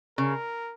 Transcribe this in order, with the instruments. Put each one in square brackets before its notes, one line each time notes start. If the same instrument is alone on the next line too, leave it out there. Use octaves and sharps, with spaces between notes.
[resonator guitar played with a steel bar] C#3 [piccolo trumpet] A#4